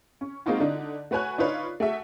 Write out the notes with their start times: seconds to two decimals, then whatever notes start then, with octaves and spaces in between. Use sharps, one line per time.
0.21 C#4
0.46 G#3 A#3 C4 D#4 F4 F#4
0.60 D3 D4 D#4
1.11 A3 F#4 B4 C#5 G#5 F#6
1.38 D4 D#4 F4 B4 C#5
1.80 A3 F#4 G#4 E5